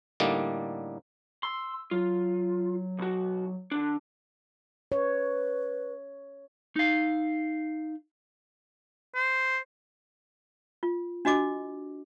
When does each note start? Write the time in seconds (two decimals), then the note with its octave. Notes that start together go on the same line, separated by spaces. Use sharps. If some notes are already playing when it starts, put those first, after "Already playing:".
0.20 A2 D3 G3 A#3 D#4
1.43 C6 E6
1.91 F#3 F4
2.98 B1 F#4
3.71 D3 D4
4.92 B4 C#5
6.76 D#4 F5
9.16 C5
10.83 F4
11.25 D4 F#4 D#5 D6